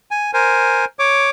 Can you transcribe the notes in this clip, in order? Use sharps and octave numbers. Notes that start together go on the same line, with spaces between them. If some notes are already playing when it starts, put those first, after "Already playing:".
G#5
A#4 C5 G#5
C#5 D6